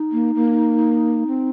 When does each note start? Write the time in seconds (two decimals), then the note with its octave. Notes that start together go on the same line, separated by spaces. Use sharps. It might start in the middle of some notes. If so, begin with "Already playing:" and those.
Already playing: D#4
0.12 A#3
0.35 A#3
1.27 C4